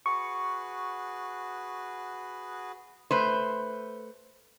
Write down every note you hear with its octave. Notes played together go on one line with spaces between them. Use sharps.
F#4 G#4 B4 C#6
A3 B4 C5